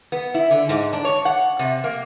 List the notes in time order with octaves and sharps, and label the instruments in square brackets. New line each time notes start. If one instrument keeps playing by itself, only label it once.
[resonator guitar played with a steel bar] B3
E4
D3
G#2
D4
C#5
F#5
C3
A#3